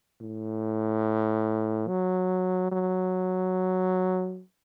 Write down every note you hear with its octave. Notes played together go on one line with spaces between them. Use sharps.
A2
F#3
F#3